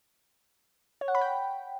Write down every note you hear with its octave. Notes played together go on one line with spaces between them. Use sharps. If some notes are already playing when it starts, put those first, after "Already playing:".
C#5
F#5
B5
G5